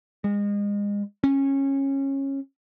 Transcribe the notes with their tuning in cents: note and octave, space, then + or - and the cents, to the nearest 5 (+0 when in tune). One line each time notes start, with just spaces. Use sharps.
G#3 -30
C#4 -20